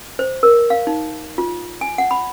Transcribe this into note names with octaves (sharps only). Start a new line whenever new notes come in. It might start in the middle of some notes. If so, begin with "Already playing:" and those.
C5
A#4
F5
D#4
F4
G#5
F#5
B5